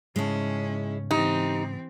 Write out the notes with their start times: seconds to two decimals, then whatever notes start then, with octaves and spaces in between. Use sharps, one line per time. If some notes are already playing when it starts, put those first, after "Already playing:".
0.16 G#2 C#3 G#3 C#4 E4 A5
1.11 E3 C4 D#4 G4